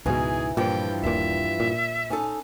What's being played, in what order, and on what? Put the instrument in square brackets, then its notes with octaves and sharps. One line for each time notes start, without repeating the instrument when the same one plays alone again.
[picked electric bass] C#2 G#2 B2 [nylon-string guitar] E3 G#3 D#4 [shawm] G#4
[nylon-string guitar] G2 E3 F3 [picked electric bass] A#2 [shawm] G5
[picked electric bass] D#1 A#2 [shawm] E5
[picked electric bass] A#2
[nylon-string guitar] C#4 D#4 A4